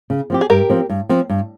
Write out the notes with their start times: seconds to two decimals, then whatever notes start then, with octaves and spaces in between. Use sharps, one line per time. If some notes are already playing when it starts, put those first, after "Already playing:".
0.10 C#3
0.30 F3 C4 G4
0.41 G#4
0.50 G2 G4 A#4
0.70 F3 C4
0.90 G2
1.09 F3 C4
1.30 G2